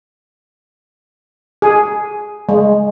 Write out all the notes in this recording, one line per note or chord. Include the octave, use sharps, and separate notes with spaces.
G#4
G#3